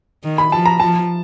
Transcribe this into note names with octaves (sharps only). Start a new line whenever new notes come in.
D#3
B5
F3 A5
A#5
F3 A5